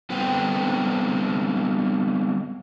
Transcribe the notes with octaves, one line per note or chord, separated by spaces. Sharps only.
G3 B3 C4 A4 B4 G5